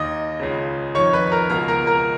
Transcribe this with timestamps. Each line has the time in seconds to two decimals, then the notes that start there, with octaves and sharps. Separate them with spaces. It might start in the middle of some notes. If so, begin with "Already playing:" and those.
Already playing: D#2 D#3 D#5 D#6
0.40 C#2 C#3
0.95 F2 D#3 C#5 C#6
1.13 B4 B5
1.32 A#4 A#5
1.50 C#2 B2 A#4 A#5
1.68 A#4 A#5
1.87 A#4 A#5